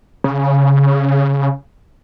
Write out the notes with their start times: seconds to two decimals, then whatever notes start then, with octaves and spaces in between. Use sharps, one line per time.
0.24 C#3